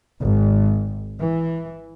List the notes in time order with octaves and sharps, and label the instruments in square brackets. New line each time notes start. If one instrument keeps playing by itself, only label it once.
[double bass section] G#1
E3